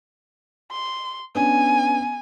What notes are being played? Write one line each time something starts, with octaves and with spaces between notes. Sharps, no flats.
C6
B3 C#4 D4 G#5